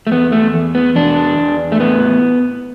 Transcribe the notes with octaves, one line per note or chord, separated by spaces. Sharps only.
A3
E2 B3
A3
E2
B3
E2 D4
E2
A3
A2 B3